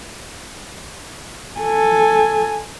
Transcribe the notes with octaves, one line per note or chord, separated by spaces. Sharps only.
A4 G#5